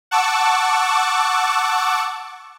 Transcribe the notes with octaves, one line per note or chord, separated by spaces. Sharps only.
F#5 A5 C#6 D6 E6